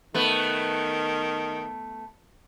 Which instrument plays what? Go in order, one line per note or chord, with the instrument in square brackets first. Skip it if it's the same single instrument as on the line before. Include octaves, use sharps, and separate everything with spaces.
[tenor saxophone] D#3 [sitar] A3 B3